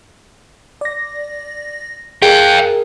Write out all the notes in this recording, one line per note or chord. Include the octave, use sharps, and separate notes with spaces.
D5 A#6
G#4 A#4 F5 G5